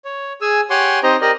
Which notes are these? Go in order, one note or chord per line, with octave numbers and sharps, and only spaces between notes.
C#5
G#4 G#5 E6
G4 C#5 F#5 G#5 C6 D6
C4 D#4 G4 C5 D#5 A#5
G4 A#4 D5 D#5